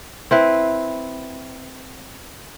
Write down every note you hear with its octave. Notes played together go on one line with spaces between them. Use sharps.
C4 E4 B4